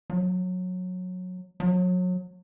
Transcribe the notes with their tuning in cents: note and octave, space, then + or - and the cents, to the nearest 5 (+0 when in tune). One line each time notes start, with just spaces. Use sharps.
F#3 -20
F#3 -30